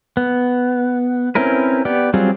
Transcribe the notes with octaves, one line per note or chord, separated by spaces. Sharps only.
B3
C4 C#4 E4 A#4 B4
B3 G4 D5
F#3 G3 C4 F4 G#4